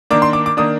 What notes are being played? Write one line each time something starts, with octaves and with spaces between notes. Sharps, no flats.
D#3 A#3 D4 D6
C6
D6
D6
D#3 A#3 D4 D#6